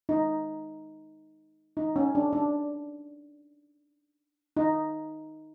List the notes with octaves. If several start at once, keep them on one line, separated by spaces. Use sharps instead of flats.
D#4
D#4
C#4
D4
D4
D#4